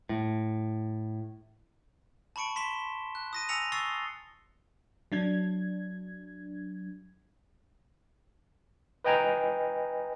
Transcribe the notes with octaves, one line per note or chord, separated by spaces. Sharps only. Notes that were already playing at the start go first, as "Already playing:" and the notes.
A2
A5 B5 C#6 C#7 D7
C6 B6 E7 G7
F#6
D#6 A#6 D#7
G#5 E6 A#6 C#7 D#7 F7
C#6 D#6 E6 A6 C7 G7
F#3 D4 G#6
B4 D#5 G5 G#5 A#5